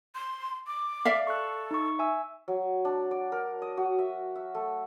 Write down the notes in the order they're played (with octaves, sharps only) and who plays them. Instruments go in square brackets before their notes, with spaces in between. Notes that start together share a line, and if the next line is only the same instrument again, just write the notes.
[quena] C6
D6
[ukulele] D5 E5 F5
[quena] A4 [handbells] C#6 F#6
[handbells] D#4 C#6
E5 G#5 E6
[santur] F#3
D4
D5
A#4
D#5
F#4
E5
E5
A3